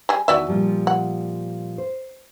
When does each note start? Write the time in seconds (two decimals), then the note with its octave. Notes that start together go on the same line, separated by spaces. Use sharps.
0.09 G3 G#4
0.28 E2 D#3 F#4 D5 E5 G#5
0.49 A#2 F3 G3
0.87 F#5
1.78 C5